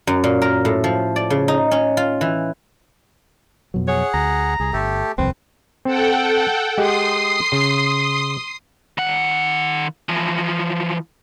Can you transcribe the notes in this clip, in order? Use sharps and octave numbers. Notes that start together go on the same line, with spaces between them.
F#2
A#2
A#4
A2
F3
D5
C#3
D#4
C#4
F4
E3
F2 B2 F#3
G#4 C#5 F#5
D2 A#5
C2 G#4
G1 A3 G4 A4
E1 C2 F2 C4 B4
C4 A4 F#5 G5
G#3 G4 F#5 C6 D#6 C7
C#3
D#3 F#5
E3 F3